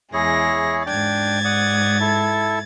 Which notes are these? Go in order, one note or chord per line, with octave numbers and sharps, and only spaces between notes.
E2 G#3 E4 G#4 C#5 A#6
G#2 D4 G5 G#6 A6
D5 F#5 D#6
E4 A4 A5